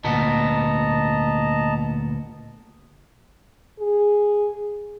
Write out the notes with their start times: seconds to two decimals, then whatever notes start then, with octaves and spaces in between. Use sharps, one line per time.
0.04 D2 A#2 B3 D#5 A5 A#5
3.79 G#4